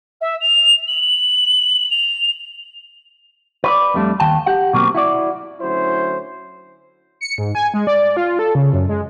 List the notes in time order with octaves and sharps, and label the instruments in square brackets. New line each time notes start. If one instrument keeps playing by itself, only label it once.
[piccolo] E5
F7
F#7
F7
[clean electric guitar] B4 C#5 D5
F2 G3 A3 D4
D#2 D#3 G5 A5
G4 F#5
B2 F#3 A#3 C4
E4 F#4 D5
[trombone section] D2 F#3 C#4 E4 C5
[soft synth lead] C#7
G#2
G#5
G#3
D5
F4
A4
C#3
F#2
G#3